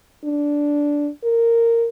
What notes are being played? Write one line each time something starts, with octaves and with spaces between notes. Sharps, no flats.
D4
A#4